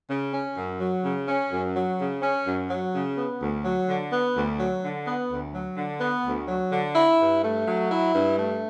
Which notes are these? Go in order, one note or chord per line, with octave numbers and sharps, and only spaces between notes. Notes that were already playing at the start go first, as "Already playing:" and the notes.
C#3
C#4
F#2
F#3
C#3
C#4
F#2
F#3
C#3
C#4
F#2
F#3
C#3
B3
D2
F#3
D3
B3
D2
F#3
D3
B3
D2
F#3
D3
B3
D2
F#3
D3
E4
G2
A3
F#3
E4
G2
A3